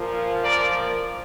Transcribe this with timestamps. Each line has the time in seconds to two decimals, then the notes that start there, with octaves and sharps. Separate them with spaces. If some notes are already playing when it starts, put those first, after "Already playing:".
Already playing: A#2 F3 A#3
0.44 A#4 D5